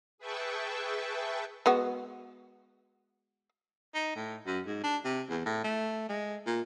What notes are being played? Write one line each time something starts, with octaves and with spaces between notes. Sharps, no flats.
G#4 B4 E5 G5 A5 C#6
G#3 B3 F#4
D#4
A2
F#2
G#2
D4
C3
E2
A2
A3
G#3
A#2